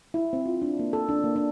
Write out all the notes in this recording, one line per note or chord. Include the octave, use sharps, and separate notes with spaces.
E4
C4
F4
D4
A#3
A4
D4
A#3
D4